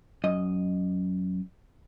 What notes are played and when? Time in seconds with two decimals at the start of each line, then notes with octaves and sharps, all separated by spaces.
0.24 F#2 D#5